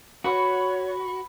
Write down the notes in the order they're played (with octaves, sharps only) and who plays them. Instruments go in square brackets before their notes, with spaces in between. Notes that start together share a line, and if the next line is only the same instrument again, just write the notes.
[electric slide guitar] F#4 [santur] B4 [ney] C#5 [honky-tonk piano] F#5 B5 C#6